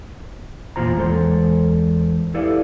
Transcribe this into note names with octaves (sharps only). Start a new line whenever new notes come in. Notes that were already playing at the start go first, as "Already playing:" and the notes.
E2 A#2 F4 C5 A#5
E2 G#3 A4 C5
E4 G4 A4 B4 D5 F5